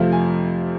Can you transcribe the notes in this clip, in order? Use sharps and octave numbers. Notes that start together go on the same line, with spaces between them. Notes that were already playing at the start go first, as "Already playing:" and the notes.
Already playing: F2 C3 F3 A3 C4 F5
G#5